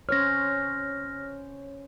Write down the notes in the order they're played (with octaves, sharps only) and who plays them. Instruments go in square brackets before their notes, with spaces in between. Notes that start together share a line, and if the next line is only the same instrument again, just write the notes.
[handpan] C#4 C5 C#5 [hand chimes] F6 A#6